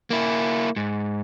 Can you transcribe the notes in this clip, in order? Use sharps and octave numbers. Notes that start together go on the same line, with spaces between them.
A#3 E4
G#2